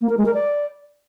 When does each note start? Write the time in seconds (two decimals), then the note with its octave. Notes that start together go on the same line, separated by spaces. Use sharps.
0.01 A#3
0.09 A#4
0.17 G#3
0.26 A#4
0.34 D5